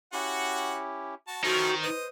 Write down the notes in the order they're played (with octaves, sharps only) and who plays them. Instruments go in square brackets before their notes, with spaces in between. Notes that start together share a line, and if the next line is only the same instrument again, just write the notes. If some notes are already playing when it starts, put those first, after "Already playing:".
[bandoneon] C#4 E4 G4 [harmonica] F#4 F#5
[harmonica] F#4 A5
[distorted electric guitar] D#3 D#4 [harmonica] F3 A3 C#4 [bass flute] F#4 [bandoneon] C5
[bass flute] B4 [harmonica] D#5